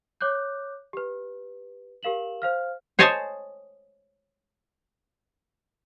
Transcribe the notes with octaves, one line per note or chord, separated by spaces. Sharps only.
C#5 D6 F#6 G6
G4 B4
G4 A#4 F5 E7 F#7
C5 F5 F6
C5 C#5 D#5 G#5 A5